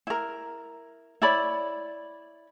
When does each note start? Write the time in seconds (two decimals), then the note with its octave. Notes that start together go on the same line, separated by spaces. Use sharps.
0.07 E4 A#4
1.22 E4 C#5 D5 B5